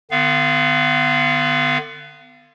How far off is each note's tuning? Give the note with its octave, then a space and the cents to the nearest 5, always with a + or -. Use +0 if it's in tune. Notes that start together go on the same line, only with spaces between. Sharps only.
D3 +35 B3 +20 F5 -25